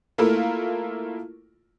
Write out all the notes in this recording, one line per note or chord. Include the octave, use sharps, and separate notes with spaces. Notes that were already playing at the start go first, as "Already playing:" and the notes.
A3 A#3 E4 F4 A4 A#4